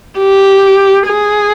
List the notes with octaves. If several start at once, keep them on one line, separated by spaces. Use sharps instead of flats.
G4
G#4